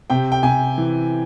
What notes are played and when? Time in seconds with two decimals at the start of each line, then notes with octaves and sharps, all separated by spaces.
0.10 C3 G5
0.32 G5
0.43 C3 G#5
0.78 E3